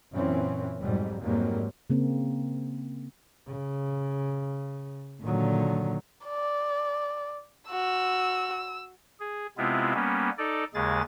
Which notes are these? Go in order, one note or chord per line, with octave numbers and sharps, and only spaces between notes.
F#2 A#2 E3 C4 C#4
F2 G#2 B2 F#3 G3
F2 G#2 F#3 G3 A#3
C#3 A#3 C4
C#3
A#2 D3 D#3 F#3
D5
F#4 E6
G#4
C3 G#3 B3 C4 E4 F4
G3 A#3 B3 C#4
D#4 A4 D5
D#2 C#3 G#3 G#4 A6